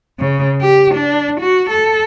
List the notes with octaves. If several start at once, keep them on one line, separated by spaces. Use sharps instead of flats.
C#3
G4
D4
F#4
A4